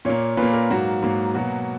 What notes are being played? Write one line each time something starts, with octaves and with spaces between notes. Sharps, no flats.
A#2 A#3 C#5
A#2 B4
A#3
A#4
G#2 F#3 A#3 F#4
G#2 F#3 A#3
B2 F#3 A#3 F#4